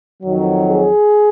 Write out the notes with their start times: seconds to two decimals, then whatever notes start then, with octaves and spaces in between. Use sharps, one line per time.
0.22 F2 D#3 F#3
0.70 G#4